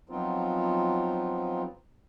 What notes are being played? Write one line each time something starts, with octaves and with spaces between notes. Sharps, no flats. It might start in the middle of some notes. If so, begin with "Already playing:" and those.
F3 F#3 B3 C4 D#4 F4